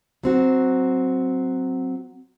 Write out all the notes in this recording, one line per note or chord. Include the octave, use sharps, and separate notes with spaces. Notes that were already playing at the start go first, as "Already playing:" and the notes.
F#3 C4 F#4